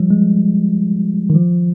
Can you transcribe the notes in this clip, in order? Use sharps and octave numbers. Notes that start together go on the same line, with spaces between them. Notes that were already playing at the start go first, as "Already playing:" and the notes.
Already playing: F3 G3
G#3
D#3
F3